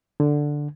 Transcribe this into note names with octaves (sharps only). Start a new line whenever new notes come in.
D3